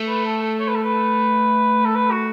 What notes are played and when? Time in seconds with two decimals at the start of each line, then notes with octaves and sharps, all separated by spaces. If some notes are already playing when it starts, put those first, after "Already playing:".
Already playing: A3
0.08 B4
0.26 A4
0.42 A4
0.59 C#5
0.68 B4
0.76 A4
0.83 B4
1.85 A4
1.95 B4
2.11 F#4